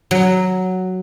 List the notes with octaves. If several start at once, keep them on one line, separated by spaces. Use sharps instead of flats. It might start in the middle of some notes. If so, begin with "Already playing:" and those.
F#3